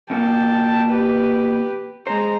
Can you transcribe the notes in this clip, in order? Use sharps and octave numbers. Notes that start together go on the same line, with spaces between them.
B2 A#3 G5 A5
G4 B4
G#3 C5 A#5